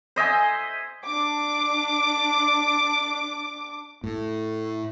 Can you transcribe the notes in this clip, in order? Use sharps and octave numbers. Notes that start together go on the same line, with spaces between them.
C5 D#5 E5 G#5
D4 D6
A2